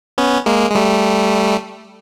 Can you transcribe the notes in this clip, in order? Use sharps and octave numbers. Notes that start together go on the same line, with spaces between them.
B3 C#4
G#3 A#3
G#3
G3 A3